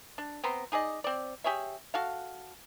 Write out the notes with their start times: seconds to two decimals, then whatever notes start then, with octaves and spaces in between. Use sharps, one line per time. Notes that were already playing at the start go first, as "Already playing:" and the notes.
0.18 D4
0.44 B3 C4 A#5 C6
0.72 D#4 G#4 D5 D#5
1.04 C4 D5
1.44 G4 G#4 C#5 E5
1.94 F#4 A4 F5